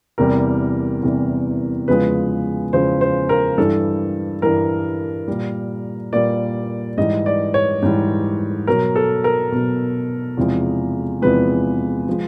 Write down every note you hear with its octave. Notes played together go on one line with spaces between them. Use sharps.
E2 C3 E3 G3 A#4
E2 C3 E3 G3
E2 C#3 F3 G#3 B4
E2 C#3 F3 G#3 C5
C5
A#4
G2 E3 G3 A4
G2 E3 G3 A#4
A#2 G3
A#2 G3 D5
G#2 E3 G3 D#5
D5
C#5
G#2 E3 G3
B2 F#3 A#4
A4
A#4
B2 F#3
E2 C3 F3 G#3
E2 C3 F3 G#3 B4
F3 G#3